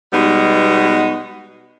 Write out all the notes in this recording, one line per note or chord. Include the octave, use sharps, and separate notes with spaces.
B2 G3 G#3 B3 D#4